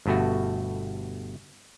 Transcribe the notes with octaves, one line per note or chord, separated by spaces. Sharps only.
G1 G2 B2 A3 F#4